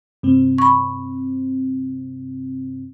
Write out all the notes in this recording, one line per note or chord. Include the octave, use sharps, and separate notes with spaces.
G2 C3 C4
B5 C#6